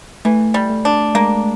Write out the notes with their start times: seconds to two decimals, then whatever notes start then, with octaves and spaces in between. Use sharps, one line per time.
0.25 E3 A3
0.54 G3
0.70 A3
0.85 D4
1.15 G#3 A#3